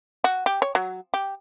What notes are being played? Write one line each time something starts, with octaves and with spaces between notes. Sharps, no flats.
F#4
G4
C#5
F#3
G4